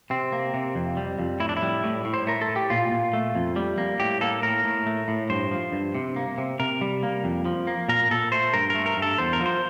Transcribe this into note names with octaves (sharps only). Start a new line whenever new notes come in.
C3 C4
A#3
C3
F2
G3
F2
A2 E4
D4
E4
G3
A2
A2
C5
A3 A#4
A4
A2
G4
A#2 F4
A#2
A3
F2
G3
A#3
A2 G4
A#3 A4
A2 A#4
A2
A3
A2
G2 C5
F3
G2
C3
A#3
C3
C3 A#4
G3
A#3
F2
F3
A#3
A#2 A#4
A#2 A4
A3 C5
G2 A#4
A#4
A3
A#4
G2
A4
E2 C5
A#4
F3
C5